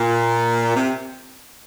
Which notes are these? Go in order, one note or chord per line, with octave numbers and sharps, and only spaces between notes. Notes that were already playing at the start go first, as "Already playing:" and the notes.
Already playing: A#2
C3